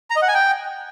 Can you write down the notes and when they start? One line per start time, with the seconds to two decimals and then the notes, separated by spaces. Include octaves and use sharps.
0.10 A#5
0.16 D#5
0.22 F#5
0.28 G#5
0.34 G5